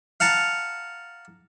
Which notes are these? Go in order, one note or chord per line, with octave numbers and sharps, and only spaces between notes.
F5 F#5 A5 A#5